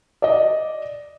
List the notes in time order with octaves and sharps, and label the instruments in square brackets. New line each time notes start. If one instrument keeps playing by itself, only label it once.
[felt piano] D5 D#5